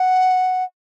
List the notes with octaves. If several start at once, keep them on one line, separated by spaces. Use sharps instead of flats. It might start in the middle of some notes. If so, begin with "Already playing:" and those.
Already playing: F#5